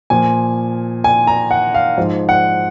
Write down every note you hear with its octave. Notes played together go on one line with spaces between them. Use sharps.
A#2 F3 G#5
G#5
A#5
F#5
F5
G#2 F3
F#5